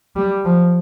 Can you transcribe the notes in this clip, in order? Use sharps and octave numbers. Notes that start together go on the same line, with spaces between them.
G3
F3